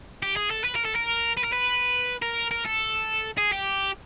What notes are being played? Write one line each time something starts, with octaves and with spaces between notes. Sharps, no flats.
G4
G#4
A4
B4
A#4
A4
A#4
B4
A#4
B4
A#4
A#4
A4
G#4
G4